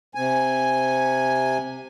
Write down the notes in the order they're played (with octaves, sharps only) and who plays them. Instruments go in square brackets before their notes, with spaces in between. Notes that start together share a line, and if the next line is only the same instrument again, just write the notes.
[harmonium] C3 G#5